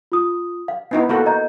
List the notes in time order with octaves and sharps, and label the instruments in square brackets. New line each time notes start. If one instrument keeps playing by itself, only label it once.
[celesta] F4 D#6
F5
[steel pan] B3 D#4 E4
A#3 F#4 A4
[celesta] D#5 A#5 G6